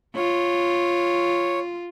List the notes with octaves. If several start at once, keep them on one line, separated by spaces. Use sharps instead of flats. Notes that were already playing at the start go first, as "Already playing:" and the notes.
F4 C#5